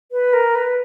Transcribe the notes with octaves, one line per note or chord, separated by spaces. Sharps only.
B4
A#4
B4